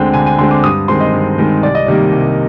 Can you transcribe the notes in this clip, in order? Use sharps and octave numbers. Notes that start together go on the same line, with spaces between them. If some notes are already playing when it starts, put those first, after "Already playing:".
Already playing: D2 D3 G#3 C4 G5
D2 G#5
G#5
D3 G#3 C4 C6
D6
G2 D#6
D#3 G#3 C4 C6
D#5
G2
D#3 G#3 C4
C2 D5
D#5
C3 D#3 G3 A#3 D5
C2